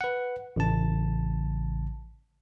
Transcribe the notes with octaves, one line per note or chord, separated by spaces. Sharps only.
B4 F#5
A1 C#3 A5